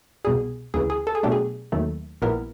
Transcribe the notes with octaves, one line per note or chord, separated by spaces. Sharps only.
C2 B2 G3 G#4
D2 C#3 E3 G#4
G#4
A4
G#4
B2 F#3 A3 D4 G4
G#4
D#2 D#3 F#3 A3
A#1 A#2 G3 B3 E4 A#4